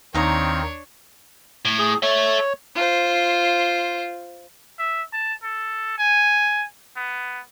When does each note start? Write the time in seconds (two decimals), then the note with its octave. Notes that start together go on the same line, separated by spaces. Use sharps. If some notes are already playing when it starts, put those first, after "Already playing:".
0.15 D#2 D#3 C4 D4 D#4 C#5 F5 A#5
1.65 A2
1.79 G#4
2.03 A4 C#5 E5
2.75 F4 C5
4.79 E5
5.13 A5
5.43 A4
5.98 G#5
6.96 B3